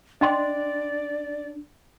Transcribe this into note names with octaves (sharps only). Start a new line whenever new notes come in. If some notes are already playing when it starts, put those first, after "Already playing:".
D4 D5 D#5 G5 C6